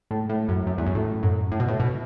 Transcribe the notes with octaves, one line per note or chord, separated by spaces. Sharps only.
A2
A2
F#2
F#2
E2
F#2
A2
F#2
A2
B2
A2
B2